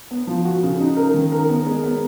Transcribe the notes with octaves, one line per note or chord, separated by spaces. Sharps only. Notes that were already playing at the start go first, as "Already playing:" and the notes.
B3
F3
F#4
C#3
D#4
A#4
D#3
A#4
B3
G#3
B3